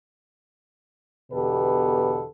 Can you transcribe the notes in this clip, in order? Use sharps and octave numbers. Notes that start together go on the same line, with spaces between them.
E2 B2 D3 G4 A4 B4